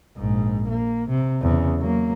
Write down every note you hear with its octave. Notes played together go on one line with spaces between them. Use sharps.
A#1 G#2
A#3
C3
E2 C#3
F#3 A#3